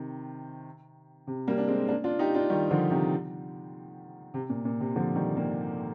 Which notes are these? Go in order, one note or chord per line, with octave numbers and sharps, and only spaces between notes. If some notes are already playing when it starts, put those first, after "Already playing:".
Already playing: C3 D#3
C3
G3 A#3
D4
G#3 C4
A#3 D4
D4 F4
D#4 G4
D4 F4
D#3 G3
D3 F3
C3 D#3
C3
A#2
A#2
C3
D3 F3
D#3 G3
G3 A#3